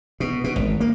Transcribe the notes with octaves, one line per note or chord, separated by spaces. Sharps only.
B2
B2
G#1
A#3